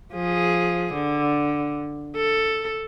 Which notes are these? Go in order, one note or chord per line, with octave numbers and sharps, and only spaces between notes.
F3 G#4
D3
A4